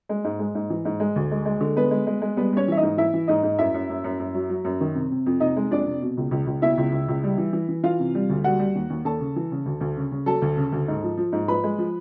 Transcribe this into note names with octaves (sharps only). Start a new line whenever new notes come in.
G#3
G#2
G#3
G#2
E3
G#2
G#3
D2
G#3
G#3
D3
G#3 B3 B4
G#3
G#3
G#3
G3 B3 B4
G3 C#4 C#5
E3 E5
D#4 D#5
G#2
E3 E4 E5
E3
G#2 D#4 D#5
G#2
F#2 E4 E5
F#2
F#2
F#2
F#2
F#3
F#3
F#2
D#3
C3
C3
F2
C3 D#4 D#5
G#3
F2 D4 D5
C3
B2
C#2
C#2
C#2
B2 E4 E5
C#2
C#2
C#2
G3
E3
E3
E3
E3 F4 F5
C3
G3
D2
G3 F#4 F#5
G3
D#2
D#2
D#2 A4 A5
C#3
E3
C#3
D2
D2
C#3
C#3
F#3 A4 A5
D2
C#3
D2
G#2
F3
F3
G#2
F3 B4 B5
G#3
F3